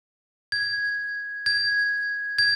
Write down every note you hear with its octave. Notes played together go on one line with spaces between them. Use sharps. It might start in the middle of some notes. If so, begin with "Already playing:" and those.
G#6
G#6
G#6